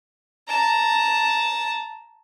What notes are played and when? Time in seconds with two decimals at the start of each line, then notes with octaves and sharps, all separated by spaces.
0.48 A5 A#5